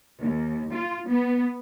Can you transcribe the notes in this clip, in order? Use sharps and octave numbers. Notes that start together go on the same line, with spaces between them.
D#2
F4
B3